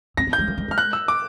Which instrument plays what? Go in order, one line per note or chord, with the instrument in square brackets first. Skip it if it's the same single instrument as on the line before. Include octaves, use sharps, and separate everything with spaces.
[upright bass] C4 [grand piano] A#6
[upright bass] B3
[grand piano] G6
[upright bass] G#3
G3
G3
[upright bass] G#3 [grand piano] F6
[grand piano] F#6
E6
D6